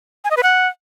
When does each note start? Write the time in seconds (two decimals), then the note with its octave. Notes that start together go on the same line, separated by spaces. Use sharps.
0.24 G#5
0.31 D#5
0.37 B4
0.43 F#5